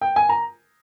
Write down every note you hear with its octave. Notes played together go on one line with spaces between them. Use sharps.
G5
G#5
A#5